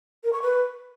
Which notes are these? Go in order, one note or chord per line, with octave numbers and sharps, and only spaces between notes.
A#4
C#6
B4